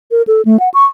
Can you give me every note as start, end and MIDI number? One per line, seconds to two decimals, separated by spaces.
0.11 0.22 70
0.27 0.42 69
0.45 0.60 57
0.60 0.69 78
0.74 0.85 85